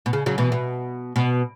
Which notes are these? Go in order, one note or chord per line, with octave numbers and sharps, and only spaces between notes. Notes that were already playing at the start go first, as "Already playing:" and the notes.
B2
C#3
C#3 F#3
B2 E3
B2
B2